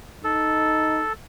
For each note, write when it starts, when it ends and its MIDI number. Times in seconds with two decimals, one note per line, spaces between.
0.24 1.03 63
0.24 1.13 69